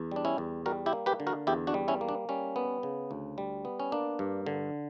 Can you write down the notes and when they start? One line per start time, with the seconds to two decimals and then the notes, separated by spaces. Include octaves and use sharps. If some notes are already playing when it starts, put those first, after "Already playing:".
Already playing: E2
0.11 G3 D4
0.25 C#4 E4
0.38 E2
0.66 G3 F#4 A#4
0.86 E4 G4
0.93 A#3
1.06 G4 B4
1.20 D3
1.27 F#4 A#4
1.47 E2 E4 G4
1.67 D4 F#4
1.74 G3
1.88 C#4 E4
2.01 A#3
2.09 D4
2.29 G3 C#4
2.56 B3
2.83 C#3
3.11 D2
3.38 G3
3.65 B3
3.80 C#4
3.92 A#3 D4
4.19 G2
4.46 D3